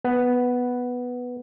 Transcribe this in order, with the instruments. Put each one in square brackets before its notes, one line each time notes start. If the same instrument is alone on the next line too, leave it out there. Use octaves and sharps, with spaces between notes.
[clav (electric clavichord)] B3